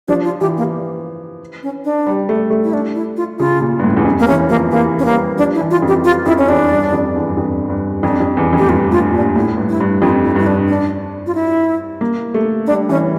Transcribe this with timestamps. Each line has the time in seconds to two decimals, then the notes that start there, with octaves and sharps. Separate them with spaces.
0.08 F3 D4
0.24 F4
0.41 E3 G4
0.57 A#3
1.63 C#4
1.85 D4
2.07 G3
2.29 A3
2.50 A3
2.64 E4
2.73 D4
2.95 E4
3.17 F4
3.39 C#3 F4
3.61 A#2
3.79 G2
3.84 A2
3.97 E2
4.05 F2
4.19 A#3
4.28 E3 C#4
4.49 F3 A#3
4.71 E3 A#3
4.99 C#4
5.05 G3 A#3
5.38 F3 D4
5.54 E4
5.61 E3
5.71 F4
5.82 F2
5.88 G4
6.04 F4
6.26 F2 E4
6.38 C#4
6.49 E2 D4
6.71 G2
6.92 F2
7.15 E2
7.27 G2
7.37 F2
7.70 G2
8.03 F2 D4
8.20 F2
8.37 E2
8.53 F2
8.58 A2 G4
8.69 G2 F4
8.92 A2 F4
9.14 A#2 D4
9.36 A2 E4
9.57 G2
9.69 E4
9.80 G2
10.02 F2 F4
10.24 E4
10.36 G2 E4
10.46 D4
10.68 D4
11.27 F4
11.35 E4
12.01 A#3
12.34 A3
12.67 G3 D4
12.89 E3 C#4